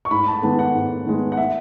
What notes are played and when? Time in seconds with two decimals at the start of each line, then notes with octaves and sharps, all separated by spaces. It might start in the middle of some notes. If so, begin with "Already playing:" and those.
0.05 C#6
0.11 G#2 B5
0.27 A5
0.42 D#3 G#3 B3 A5
0.59 F#5
0.75 G#2
1.06 D#3 G#3 B3
1.32 F#5
1.37 E5